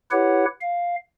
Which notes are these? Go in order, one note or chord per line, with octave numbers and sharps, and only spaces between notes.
E4 G4 B4 C#5 F#5
F5